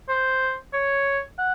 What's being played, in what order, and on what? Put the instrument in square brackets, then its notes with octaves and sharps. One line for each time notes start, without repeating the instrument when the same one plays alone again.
[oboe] C5
C#5
F#5